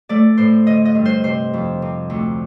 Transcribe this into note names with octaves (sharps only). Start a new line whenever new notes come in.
A3 D5
A2 C5
D3 D#5
D#5
G2
C5
C3 C5
F2
C3
D2